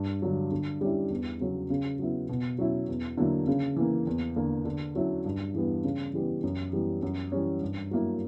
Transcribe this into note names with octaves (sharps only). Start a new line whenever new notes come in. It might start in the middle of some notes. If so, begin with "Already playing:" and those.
Already playing: G2
D3 F#3
D3
G3 C#4 E4
E2
C#3 F#3 C#4
C#3
F#3 B3 E4
B2
F#3 C#4 E4
E2
D3 F#3 A#3 E4
C#3
E3 A#3
E2
D3 A#3
D3
F#3 C#4 E4
G2
E3 G3 B3
C#3
E3 G3 B3
F#2
E3 G3 B3
F#2
E3 G3 C#4
G2
F#3 A#3 E4